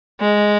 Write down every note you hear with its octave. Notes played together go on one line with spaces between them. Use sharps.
G#3